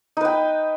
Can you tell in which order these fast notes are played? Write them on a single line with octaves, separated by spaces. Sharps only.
D#4 B4 G5